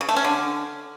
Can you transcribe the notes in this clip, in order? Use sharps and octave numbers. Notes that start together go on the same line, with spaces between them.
C#3
A3
C#4
D3